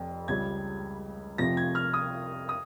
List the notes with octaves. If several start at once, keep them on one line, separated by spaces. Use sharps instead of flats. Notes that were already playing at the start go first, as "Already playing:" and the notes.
Already playing: F1 F2
C#2 C#3 G3 G#6
F1 F2 C3 F3 A#6
G#6
F6
D#6
D#6